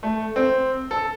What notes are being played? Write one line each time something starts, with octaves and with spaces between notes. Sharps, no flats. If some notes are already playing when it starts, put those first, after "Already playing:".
A3
C4
A4